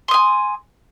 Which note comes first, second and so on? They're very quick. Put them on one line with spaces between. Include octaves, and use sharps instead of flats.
C6 D#6 G#5